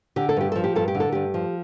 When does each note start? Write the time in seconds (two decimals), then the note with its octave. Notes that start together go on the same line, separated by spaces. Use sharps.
0.16 D3 G4
0.29 A4
0.37 G2 G4
0.52 F3 A4
0.64 G4
0.75 G2 A4
0.88 G4
0.95 D3
1.00 A4
1.12 G2 G4
1.34 F3